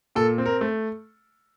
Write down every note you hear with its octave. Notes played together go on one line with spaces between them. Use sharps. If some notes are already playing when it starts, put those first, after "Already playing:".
A#2 A4
C4
A#4
A3